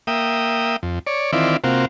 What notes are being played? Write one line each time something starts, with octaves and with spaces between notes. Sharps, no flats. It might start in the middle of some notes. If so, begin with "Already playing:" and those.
A#3 E5 G5 D#6
F2
C#5 D5
D#3 E3 C4 E4 F4 D5
C3 A#3 C4 F4 F#4